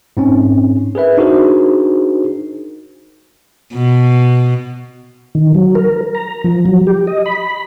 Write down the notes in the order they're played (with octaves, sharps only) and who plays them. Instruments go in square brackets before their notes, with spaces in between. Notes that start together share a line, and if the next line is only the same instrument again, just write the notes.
[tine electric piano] G#2 C4 C#4
G#4 A#4 B4 E5
D4 D#4 F#4 G#4 A#4 C5
[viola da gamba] B2
[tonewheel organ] D#3
F#3
A#4
A#5
F3
F#3
G4
D#5
B5